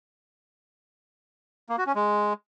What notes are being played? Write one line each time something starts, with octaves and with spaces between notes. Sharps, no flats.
A#3
F#4
C#4
G#3